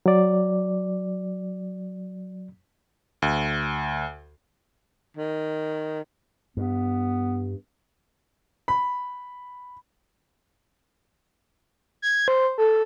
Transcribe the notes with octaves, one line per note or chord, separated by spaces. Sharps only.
F#3 D5
D2
D#3
G2 B3
B5
G#6
C5
A4